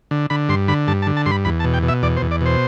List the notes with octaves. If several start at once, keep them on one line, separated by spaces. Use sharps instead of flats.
D3
D3 B5
G2 C6
D3 B5
G2 A5
A5
D3
A5
G2 C6
B5
E2 B5
A5
B2
G5
B2
E5
E2 D5
C5
E2
D5
B2 C5